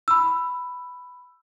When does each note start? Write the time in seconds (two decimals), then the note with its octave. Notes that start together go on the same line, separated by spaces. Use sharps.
0.08 B5 E6